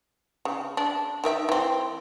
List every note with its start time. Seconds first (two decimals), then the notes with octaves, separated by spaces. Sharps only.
0.45 C#3
0.77 D4
1.24 D#3 A#4 E5
1.49 E3 C4